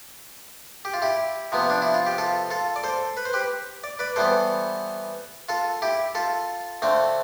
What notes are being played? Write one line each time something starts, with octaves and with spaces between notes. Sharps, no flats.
G4
F4
E4 G4
C3 F3 B3
D4
E4
F4
G4
F4 A4
F4 A4
D5
A4 C5
B4
C5
G4 B4
D5
B4 D5
E3 G3 B3 A4 C5
F4 A4
E4 G4
F4 A4
D3 A3 C4